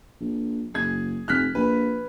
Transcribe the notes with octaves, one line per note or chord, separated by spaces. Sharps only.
A#1
F#1 G#4 G#6
F1 F6 F#6 B6
A#1 B4